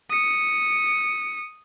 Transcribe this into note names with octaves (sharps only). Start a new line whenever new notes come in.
D#6 C#7